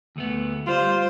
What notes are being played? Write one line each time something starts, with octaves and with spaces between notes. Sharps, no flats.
D2 A3 B3
G3 F4 C5